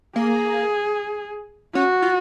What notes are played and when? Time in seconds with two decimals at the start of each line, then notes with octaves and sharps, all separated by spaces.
0.16 A#3 G#4
1.75 C#4 F#4
2.02 F4